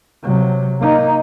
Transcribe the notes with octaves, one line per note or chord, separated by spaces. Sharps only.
C3 F#3
A#3 D#4